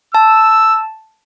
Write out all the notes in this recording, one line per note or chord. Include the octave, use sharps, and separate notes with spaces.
A5 E6